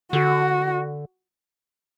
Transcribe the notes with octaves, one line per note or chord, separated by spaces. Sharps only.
D3 F#4